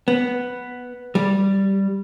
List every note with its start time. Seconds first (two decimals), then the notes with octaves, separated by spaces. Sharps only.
0.08 B3
1.15 G3